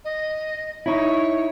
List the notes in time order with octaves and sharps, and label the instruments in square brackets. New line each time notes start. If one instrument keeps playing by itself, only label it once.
[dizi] D#5
[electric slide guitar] D#4 E4 [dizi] C#5